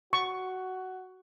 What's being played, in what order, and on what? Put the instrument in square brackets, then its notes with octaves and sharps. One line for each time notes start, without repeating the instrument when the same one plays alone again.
[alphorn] F#4 [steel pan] C#6